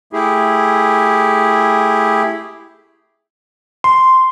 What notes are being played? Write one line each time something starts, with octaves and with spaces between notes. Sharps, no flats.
A3 E4 G4 G#4
C6